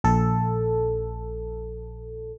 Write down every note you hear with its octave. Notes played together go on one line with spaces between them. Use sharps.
A#1 A4